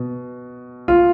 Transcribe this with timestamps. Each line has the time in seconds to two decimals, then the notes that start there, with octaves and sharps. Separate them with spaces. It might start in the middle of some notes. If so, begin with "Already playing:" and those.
Already playing: B2
0.88 F4